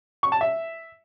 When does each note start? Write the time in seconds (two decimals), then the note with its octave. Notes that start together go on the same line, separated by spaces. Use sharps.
0.23 C#6
0.32 A5
0.41 E5